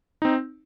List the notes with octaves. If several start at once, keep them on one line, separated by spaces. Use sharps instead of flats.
C4 D#4